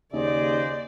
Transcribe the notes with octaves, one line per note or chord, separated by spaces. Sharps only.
D#2 C#3 G#4 C5 D5 D#5